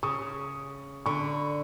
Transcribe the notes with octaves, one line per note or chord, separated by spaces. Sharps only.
C#3 C#6 D#6
D3 B5 C#6